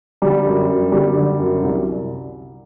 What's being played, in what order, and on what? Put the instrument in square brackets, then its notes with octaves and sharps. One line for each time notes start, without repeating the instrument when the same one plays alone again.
[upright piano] D3 G3
F#2
F#2
D3 G3
D3
F#2
C2